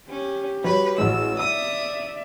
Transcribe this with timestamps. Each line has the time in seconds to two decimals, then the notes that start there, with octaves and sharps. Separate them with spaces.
0.11 C#4 G4
0.64 F#3 G3 B4 C#5 B5
0.98 A1 F#3 G#3 E6
1.39 D5 E5 D#6 E6